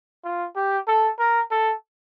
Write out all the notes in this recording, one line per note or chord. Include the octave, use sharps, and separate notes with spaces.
F4
G4
A4
A#4
A4